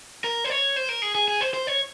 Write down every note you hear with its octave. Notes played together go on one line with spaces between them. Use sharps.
A#4
C5
C#5
C5
A#4
G#4
G#4
G#4
C5
C5
C#5